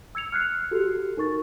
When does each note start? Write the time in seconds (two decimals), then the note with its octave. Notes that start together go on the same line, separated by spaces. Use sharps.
0.15 E6 G#6 C#7 F7
0.32 F6 F#6 C7
0.71 F#4 G4 A4
1.17 D#4 A#4 C#6 A6